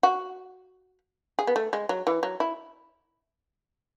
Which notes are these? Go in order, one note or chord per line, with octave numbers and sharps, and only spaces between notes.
F#4
G#4
B3
A3
G#3
F#3
E3
F#3
E4